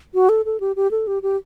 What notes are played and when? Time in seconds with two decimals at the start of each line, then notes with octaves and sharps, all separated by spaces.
0.14 F#4
0.29 A4
0.45 A4
0.60 G4
0.76 G4
0.91 A4
1.07 G4
1.23 G4